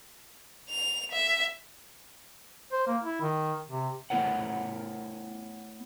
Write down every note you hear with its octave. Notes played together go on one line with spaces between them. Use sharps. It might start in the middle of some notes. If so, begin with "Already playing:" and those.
F7
E5
C5
A#3
E4
D#3
C3
A3 B3 E4 A#4 C#5 F#5